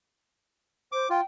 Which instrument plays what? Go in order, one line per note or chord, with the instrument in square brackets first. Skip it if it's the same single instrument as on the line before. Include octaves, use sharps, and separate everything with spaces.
[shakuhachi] C5 [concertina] D6
[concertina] F4 [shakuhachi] G5